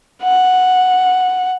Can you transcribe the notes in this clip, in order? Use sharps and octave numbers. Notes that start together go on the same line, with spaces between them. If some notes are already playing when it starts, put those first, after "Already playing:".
F#5